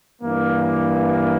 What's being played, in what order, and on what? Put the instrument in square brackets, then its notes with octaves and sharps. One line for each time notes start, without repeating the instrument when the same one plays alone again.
[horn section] G2 E3 A#3